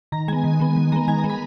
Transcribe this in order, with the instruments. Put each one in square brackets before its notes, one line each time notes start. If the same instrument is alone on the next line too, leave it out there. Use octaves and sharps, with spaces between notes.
[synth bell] D#3 A#5
G#3 B3 G#5
D#3
G#3 B3
D#3
G#3 B3 A#5
D#3 G#5
A#5
G#3 B3
B5